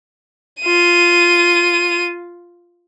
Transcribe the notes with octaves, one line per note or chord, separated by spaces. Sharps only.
F4 D#7